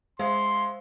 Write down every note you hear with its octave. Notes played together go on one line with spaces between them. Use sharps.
G#3 C5 F5 C6 E6